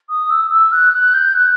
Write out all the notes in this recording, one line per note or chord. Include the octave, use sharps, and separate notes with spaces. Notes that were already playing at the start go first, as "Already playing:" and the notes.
D#6
E6
E6
F#6
F#6
G6
F#6